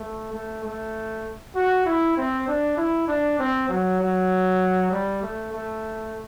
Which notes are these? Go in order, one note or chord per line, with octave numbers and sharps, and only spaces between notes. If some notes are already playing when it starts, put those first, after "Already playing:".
Already playing: A3
A3
A3
F#4
E4
C4
D4
E4
D4
C4
F#3
F#3
G3
A3
A3